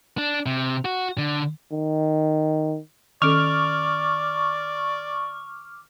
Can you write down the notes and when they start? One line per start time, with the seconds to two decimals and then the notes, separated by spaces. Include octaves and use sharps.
0.18 D4
0.46 C3
0.85 F#4
1.18 D3
1.72 D#3
3.22 D#3 C#4 A4 D5 C#6 D6 F6